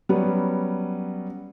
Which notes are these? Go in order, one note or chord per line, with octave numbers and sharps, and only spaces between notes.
F#3 G3 B3 C#4